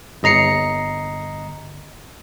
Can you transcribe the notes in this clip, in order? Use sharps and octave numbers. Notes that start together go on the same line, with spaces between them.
G1 D#5 A#5 C7 C#7